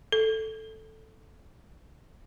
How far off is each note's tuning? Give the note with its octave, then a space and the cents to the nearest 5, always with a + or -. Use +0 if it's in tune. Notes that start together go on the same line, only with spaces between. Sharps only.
A4 +0